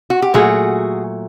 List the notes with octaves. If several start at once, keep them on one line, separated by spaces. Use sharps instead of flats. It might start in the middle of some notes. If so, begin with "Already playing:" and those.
F#4
G4
A#2 F#3 A3 F#4 G#4